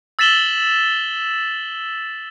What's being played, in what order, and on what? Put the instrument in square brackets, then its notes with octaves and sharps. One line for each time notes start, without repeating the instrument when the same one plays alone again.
[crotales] E6 A6 B6 E7 F#7 G7